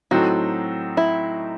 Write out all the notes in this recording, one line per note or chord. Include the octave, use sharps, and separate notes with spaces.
A2 F#3 C4 D#4 F#4 A4
E4